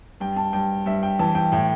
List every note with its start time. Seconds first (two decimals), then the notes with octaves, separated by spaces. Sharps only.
0.20 G2 G5
0.37 A5
0.53 G2 G5
0.86 G2 E5
1.03 G5
1.19 E3 A5
1.35 G5
1.52 A2 G5